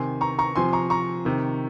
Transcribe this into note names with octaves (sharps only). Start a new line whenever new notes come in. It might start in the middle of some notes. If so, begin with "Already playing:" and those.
Already playing: C3 D#3 G#5 C6
A#5 C#6
A#5 C#6
C3 F3 G#5 C6
A#5 C#6
A#5 C#6
C3 D#3